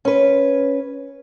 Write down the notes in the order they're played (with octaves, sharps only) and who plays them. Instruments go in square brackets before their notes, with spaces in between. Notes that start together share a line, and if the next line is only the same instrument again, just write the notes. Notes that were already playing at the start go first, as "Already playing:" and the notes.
[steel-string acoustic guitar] C#4 B4